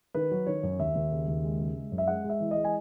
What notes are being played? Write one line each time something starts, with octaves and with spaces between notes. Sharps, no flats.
D#3 B4
F#3
D#3 C#5
F#2
D#2 E5
D#2
C#3
D#2
G#3
C#3
G#3
F#2
E5
G#3 F#5
G#3
E5
E3
G#3 D#5
G#5